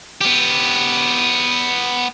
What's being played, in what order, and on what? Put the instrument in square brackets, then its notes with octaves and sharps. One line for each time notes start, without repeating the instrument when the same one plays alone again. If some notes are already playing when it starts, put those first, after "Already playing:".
[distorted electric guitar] B3 G4